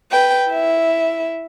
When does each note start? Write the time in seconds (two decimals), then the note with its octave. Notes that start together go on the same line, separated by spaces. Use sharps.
0.11 B4 G5
0.50 E4 E5